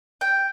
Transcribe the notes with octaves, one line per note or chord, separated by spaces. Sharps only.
G5